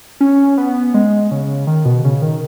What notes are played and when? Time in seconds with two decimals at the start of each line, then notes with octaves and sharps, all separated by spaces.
0.20 C#4
0.58 B3
0.94 G#3
1.31 C#3
1.67 D#3
1.85 B2
2.05 C#3
2.22 D#3